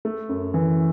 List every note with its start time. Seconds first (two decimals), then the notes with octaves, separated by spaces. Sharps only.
0.05 A3
0.29 F#2
0.54 E3